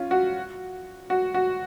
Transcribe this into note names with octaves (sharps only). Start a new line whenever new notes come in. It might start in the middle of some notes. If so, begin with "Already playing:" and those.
Already playing: C#4 F4
F#4
F#4
F#4